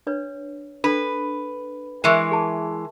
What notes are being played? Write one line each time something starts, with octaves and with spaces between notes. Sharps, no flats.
D4 B4 C#5
D4 A4 B4
E3 G#3 A#4 E5 C#6
G#4 A5